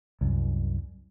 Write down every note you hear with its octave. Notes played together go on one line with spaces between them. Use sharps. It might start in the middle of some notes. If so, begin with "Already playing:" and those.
C2 F#2